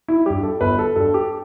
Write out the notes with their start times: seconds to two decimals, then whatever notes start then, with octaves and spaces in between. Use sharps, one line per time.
0.08 E4
0.26 G2 G3 G4
0.43 A4
0.61 G1 B4
0.79 A4
0.96 G2 G3 A4
1.14 G4